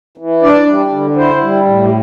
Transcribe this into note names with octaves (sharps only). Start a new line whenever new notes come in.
E3
D4 D5
G3
D3
E4 C5
G3
A2
G4